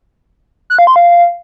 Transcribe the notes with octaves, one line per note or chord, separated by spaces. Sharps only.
F#6
F5
C6
F5